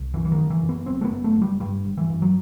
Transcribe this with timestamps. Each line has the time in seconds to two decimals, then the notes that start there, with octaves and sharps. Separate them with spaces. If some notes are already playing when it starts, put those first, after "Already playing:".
Already playing: C2
0.14 F#2 E3
0.25 E3
0.32 D#3
0.38 F#1
0.50 E3
0.63 F#2
0.69 B3
0.86 F#1 C4
1.01 A3
1.05 B3
1.11 F#2
1.24 A3
1.35 F#1
1.42 G3
1.60 G2 G3
1.85 G1
1.97 E3
2.10 G2
2.22 F#3